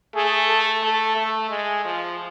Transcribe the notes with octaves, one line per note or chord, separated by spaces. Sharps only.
A3 G#4
A4
A3 A4
A3
G#3
F3